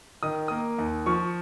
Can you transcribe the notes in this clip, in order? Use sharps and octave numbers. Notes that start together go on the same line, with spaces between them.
D#3 D#6
A#3 D#6
D#2
F3 C#6